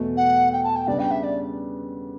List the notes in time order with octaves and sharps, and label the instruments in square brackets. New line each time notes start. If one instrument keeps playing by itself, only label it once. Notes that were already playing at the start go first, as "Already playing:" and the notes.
Already playing: [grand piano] E2 B2 A3
[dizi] F#5
G5
A5
G5
[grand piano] C#3 G3 B3 D4 [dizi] D5
[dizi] G5
E5
D5